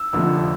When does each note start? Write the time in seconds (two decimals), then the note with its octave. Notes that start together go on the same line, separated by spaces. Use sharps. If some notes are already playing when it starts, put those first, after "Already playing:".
Already playing: E6
0.13 F1 F2 D3 F3 A3